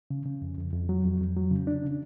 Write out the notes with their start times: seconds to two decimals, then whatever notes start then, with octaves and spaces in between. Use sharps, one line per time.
0.11 C#3
0.26 C#3
0.42 F2
0.58 F2
0.73 F2
0.89 F#3
1.05 F2
1.21 F2
1.37 F#3
1.51 C#3
1.67 D4
1.83 C#3